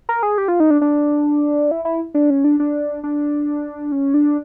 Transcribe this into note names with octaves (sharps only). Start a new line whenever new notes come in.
A#4
G#4
G4
F4
D#4
D4
D4
E4
E4
D4
C#4
D4
D4
D4
C#4
D4